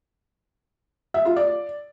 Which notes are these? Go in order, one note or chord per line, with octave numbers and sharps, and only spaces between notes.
E5
F4
D5